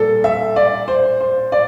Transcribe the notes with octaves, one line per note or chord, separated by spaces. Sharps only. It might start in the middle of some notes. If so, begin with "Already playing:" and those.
Already playing: A#2 G3 A4
E5
D5
C5
C5
D5